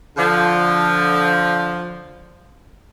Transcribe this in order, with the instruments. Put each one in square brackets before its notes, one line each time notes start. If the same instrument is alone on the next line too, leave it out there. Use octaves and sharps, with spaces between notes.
[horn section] D3 F3